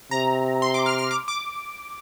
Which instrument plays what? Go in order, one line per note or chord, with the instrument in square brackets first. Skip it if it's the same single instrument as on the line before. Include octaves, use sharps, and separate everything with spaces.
[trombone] C3 [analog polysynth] A#5
[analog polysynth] C6
D6
F6
F6
D6
D6